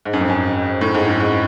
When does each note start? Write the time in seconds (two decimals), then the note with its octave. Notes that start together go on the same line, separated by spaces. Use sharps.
0.05 G#2
0.13 F#2
0.21 F2
0.30 F#2
0.81 A2
0.94 G#2
1.08 F#2
1.20 G#2